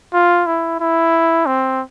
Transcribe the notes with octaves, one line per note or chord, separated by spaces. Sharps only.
F4
E4
E4
C4